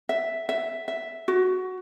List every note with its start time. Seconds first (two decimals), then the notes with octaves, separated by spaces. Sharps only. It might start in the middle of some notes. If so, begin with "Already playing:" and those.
0.09 E5
0.49 E5
0.88 E5
1.28 F#4